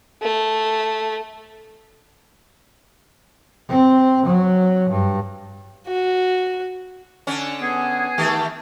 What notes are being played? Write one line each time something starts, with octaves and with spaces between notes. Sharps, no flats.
A3
C4
F#3
G2
F#4
D3 C#4
B3 G#4
D#3 A3 G4